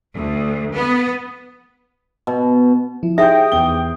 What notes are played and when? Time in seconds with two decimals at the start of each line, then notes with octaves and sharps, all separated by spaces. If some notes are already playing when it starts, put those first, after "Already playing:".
0.14 D2
0.74 B3
2.27 B2
3.03 F3 E4
3.18 D#4 G4 G#4 C5 E5 G5 D#6 G6
3.52 E2 G7